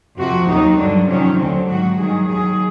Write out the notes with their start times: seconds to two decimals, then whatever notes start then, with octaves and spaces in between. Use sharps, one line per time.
0.17 F2 C3 F3 F#4
0.48 D#2 D#3 F#3 D#4
0.78 G2 D3 F#3 D4
1.08 F2 C3 D#3 F#3 C#4
1.39 D2 D3 F#3 C4
1.69 G#2 D#3 F#3 F#4
1.99 G2 D#3 F#3 G#4
2.29 D#2 D#3 F#3 G#4